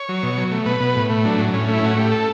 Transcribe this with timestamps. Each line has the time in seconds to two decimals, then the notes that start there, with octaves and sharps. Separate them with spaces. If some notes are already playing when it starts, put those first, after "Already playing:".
Already playing: C#5
0.09 F#3
0.23 B2
0.38 F#3
0.51 A3
0.66 B2 B4
0.80 B2
0.96 A2
1.10 A3
1.25 F#3 D4
1.39 A2
1.53 A2 C#4
1.69 A3 E4
1.82 A2 F#4
1.97 A3 G4
2.12 A4